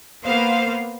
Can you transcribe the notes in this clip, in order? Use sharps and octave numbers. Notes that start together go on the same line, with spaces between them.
A#3 B3 C5 F5